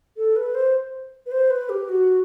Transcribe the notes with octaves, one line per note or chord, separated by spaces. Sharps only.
A4
B4
C5
B4
C5
B4
G4
F#4